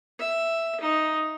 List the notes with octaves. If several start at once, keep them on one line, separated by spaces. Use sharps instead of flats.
E5
D#4